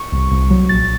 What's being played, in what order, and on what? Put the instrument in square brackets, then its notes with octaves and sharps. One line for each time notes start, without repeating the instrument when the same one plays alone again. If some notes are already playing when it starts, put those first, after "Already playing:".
Already playing: [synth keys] C#6
C2
C2
F#3
A#1 A6